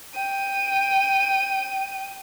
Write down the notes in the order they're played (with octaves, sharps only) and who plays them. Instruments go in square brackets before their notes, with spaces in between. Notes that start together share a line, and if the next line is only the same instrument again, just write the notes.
[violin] G5 D#7